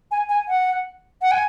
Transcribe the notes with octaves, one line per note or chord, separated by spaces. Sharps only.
G#5
G#5
F#5
F#5
G#5